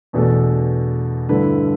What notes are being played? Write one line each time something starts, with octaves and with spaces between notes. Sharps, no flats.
E2 B2 A3 D4 A4
G2 D3 A3 E4 B4